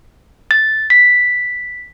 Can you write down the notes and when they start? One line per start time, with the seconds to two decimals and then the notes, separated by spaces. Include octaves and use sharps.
0.51 A6
0.90 B6